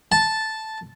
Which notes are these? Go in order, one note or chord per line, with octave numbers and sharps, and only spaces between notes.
A5